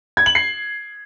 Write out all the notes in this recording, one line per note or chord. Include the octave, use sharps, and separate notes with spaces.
G#6
F#7
C7